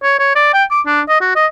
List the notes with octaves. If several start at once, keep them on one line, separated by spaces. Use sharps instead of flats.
C#5
C#5
D5
G5
D6
D4
D#5
F#4
D#5